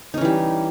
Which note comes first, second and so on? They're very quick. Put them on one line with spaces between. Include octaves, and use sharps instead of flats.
D#4 C#4 E3 G3